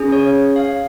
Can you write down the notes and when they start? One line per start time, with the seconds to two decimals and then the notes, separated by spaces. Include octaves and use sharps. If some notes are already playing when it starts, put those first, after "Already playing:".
Already playing: C#4 G#4
0.12 C#5
0.56 F5